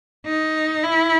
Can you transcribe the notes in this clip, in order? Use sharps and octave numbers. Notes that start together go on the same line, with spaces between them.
D#4
E4